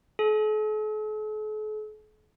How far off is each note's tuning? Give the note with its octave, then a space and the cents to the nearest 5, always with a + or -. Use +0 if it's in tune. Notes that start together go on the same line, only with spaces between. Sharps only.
A4 -45